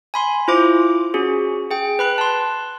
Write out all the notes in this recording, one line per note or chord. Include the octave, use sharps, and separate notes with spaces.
G#5 B5 C6
E4 F4 C5 D6
C#4 F#4 G#4
G#4 G5
B4 B5 F#6
A5 C6